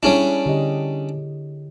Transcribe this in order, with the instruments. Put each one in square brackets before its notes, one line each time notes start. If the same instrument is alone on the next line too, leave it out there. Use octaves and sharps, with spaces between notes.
[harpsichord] G3 C#4 D4 [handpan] E4 G#4 C#5
[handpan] D3 G4 D#5